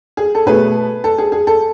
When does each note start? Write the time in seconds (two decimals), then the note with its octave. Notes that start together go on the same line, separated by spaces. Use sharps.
0.17 G#4
0.35 A4
0.46 B2 A3 G#4 B4
1.04 A4
1.18 G#4
1.32 G#4
1.47 A4